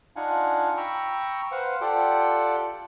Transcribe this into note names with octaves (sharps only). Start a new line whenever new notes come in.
D4 D#4 F4 F5 F#5 G#5
G5 A#5 B5 C#6 E6
B4 C5 F5 F#5
F4 G4 A4 D5 F#5 G5